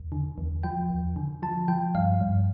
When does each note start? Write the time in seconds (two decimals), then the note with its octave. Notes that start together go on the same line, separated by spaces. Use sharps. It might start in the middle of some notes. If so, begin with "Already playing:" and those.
Already playing: E2
0.12 D3
0.38 E2
0.63 F3 G5
0.89 E2
1.16 D3
1.42 F3 A5
1.68 F3 G5
1.95 G2 F5
2.21 G2